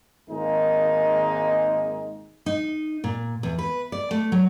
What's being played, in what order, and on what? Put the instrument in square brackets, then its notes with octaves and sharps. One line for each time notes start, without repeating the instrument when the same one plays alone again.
[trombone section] G#1 D#3 G#3 A#3 D#4
[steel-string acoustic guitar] D#4
A#2
E2
B4
D5
A3
F#3